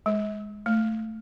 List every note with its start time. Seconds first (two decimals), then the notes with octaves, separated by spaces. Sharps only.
0.06 G#3
0.66 A3